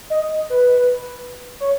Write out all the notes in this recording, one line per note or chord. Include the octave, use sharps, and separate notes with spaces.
D#5
B4
C#5